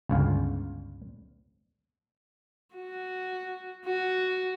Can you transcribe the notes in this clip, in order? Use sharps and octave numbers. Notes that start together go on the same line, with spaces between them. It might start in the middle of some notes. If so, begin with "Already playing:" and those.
G1 C#2 F5
F#4
F#4